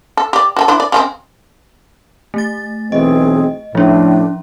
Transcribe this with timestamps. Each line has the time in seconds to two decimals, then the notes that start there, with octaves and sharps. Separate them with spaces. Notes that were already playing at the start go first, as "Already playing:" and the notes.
0.17 A4
0.33 G4 D5
0.57 F#4 G4 A4
0.68 D4 E4 C5
0.80 D5
0.92 C#3 G#3 C4
2.34 A3 A6
2.92 B1 E3 C4 G#4 D#5
3.75 A2 F3 C#4 D4